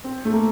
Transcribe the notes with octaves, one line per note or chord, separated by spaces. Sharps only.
C4
A3
A#3